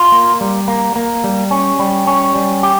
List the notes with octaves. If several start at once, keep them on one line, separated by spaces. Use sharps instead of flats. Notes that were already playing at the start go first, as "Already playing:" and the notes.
Already playing: F4
A#3
G3
A#3
A#3
G3
C#4
G3
C#4
G3
G4